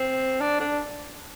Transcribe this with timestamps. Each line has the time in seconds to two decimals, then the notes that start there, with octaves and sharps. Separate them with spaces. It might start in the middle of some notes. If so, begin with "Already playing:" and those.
Already playing: C4
0.41 D4
0.60 D4